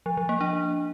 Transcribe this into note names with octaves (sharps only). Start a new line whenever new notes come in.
F3
F3
A#3
D4